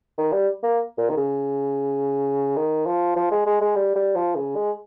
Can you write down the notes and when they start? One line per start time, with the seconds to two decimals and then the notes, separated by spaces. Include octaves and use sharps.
0.18 D#3
0.32 G3
0.63 A#3
0.97 A#2
1.09 D#3
1.17 C#3
2.56 D#3
2.86 F3
3.16 F3
3.31 G#3
3.46 G#3
3.61 G#3
3.76 G3
3.95 G3
4.15 F3
4.36 C#3
4.55 G#3